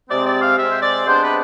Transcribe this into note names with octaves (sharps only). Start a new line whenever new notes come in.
C3 G#3 C4 D5
D5
F5
C3 G#3 C4 E5
C5
D5
C3 G#3 B3 D4 C5
B4